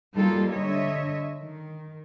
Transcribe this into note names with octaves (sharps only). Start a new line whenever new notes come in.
F#3 G3 A#3 D#4 F4 A4
D3 C#5 D#5 E5
D#3